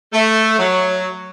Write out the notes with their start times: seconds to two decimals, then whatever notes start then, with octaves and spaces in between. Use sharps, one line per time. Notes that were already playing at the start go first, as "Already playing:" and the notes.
0.13 A3
0.59 F#3